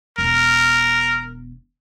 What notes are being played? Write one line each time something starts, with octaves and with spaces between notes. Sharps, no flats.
E1 B3 A#4